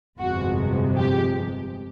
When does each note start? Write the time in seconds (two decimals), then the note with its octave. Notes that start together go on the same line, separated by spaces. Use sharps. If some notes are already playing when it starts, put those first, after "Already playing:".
0.19 G1 F2 C3 F3 G#3 F#4
0.97 G4